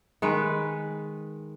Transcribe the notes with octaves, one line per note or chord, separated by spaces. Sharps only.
D#3 G#3 B4